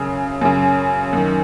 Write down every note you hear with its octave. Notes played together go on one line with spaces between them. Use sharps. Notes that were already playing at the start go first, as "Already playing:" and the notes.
Already playing: F#2 C#3
F#2 C#3
F#2 D#3